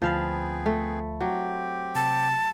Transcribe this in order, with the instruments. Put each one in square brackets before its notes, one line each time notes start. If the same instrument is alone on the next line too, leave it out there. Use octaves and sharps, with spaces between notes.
[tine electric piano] D2 A5 B5 [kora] F3 F5 [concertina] B3 C4 G#4
[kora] A3
[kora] F#3 [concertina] C4 G4
[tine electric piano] C3 [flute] A5